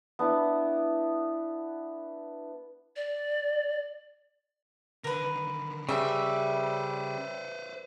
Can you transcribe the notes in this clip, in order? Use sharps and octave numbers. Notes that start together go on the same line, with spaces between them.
B3 D4 E4
D5
D3 D#3 A#4 B4
C#3 G3 B4 C5 E5